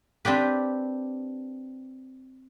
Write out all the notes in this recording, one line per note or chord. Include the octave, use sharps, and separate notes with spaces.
C4 D4 G4 B4